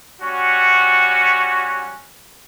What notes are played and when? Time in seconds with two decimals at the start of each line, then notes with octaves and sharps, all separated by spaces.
0.21 G3 C#4 F#4